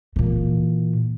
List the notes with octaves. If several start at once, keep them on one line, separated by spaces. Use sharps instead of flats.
A#2 E3